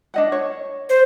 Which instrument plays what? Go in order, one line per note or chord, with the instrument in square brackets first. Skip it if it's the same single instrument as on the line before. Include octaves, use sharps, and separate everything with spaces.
[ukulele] D4 D#5 F#5
C#5
[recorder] C5